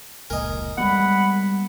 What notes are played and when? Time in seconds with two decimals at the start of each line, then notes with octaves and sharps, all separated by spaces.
0.30 F1 C#2 A#2 A#4 D#5 G#5
0.78 G3 G#3 B3 F#5 B5